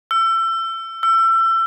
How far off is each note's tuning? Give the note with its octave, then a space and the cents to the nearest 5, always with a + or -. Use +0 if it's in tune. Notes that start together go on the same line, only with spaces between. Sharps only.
E6 +30
E6 +30